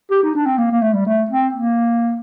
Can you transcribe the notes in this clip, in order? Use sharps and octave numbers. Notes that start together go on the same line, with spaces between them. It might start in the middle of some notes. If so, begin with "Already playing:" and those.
G4
D#4
D4
C4
A#3
A#3
A3
G3
A3
C4
A#3